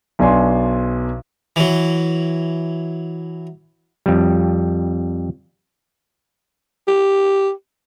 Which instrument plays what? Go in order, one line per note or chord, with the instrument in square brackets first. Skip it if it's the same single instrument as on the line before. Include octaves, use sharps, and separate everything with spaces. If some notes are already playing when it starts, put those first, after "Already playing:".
[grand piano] B1 B2 D4 G#5 C6
[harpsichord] E3 F#3
[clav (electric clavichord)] F2 G3
[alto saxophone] G4